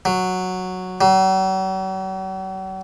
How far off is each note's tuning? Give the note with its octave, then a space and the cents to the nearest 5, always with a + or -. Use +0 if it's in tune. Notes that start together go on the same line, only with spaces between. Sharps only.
F#3 -5
F#3 +45